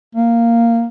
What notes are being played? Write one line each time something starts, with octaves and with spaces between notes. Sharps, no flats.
A#3